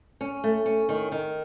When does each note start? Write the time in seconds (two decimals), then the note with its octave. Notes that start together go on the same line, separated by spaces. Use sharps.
0.21 C#4
0.44 A3
0.66 C#4
0.89 D#3
1.12 D#3